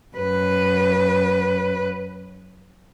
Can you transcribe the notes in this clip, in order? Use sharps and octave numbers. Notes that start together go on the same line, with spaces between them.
F#2 B4